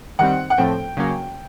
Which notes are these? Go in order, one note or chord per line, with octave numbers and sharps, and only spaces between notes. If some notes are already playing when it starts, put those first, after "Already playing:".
D#3 G3 C4 F#5
F#5
A2 F3 A3 C4 G5
C#3 F#3 A#3 C#4